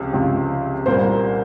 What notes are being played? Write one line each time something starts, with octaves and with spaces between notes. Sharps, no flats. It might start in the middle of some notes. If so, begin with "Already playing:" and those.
Already playing: C#2 C3 F3
C#2 C3 F3
C2 A#2 G3 A#3 C5